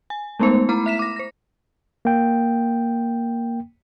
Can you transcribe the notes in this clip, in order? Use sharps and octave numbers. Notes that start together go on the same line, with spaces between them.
G#5
G#3 A3 B3 D#4 C5
A3 E4 A#5 B5 D6
E5 B6 E7
D6 A#6
C5 A#6
A#3 G5